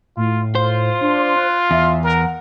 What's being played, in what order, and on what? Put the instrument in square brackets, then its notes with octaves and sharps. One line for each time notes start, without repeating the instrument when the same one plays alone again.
[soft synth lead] A2 [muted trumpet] F4
[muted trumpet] F4 [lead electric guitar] C5
[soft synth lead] D4
F#6
[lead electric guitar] E2 [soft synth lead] E5
[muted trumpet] A#4 [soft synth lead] F#5